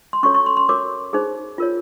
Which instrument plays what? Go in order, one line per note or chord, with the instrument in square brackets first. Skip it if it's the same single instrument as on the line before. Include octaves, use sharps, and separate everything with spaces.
[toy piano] C6
C#4 F#4 A4 C#5 C#6
C#6
C6
C6
F#4 A#4 C#5 D6
D#4 G#4 C5
F4 A#4 C#5